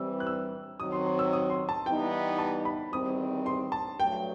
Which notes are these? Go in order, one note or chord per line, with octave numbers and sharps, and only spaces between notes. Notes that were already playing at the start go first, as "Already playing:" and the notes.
Already playing: E3 G3 C4 E6
F#6
E6
D#3 F#3 C4 D#6
C6
C6
E6
D#6
C6
A5
E3 G3 B3 D#4 G5
A5
B5
E2 D#3 G3 C4 D#6
C6
A5
G2 F#3 A3 G5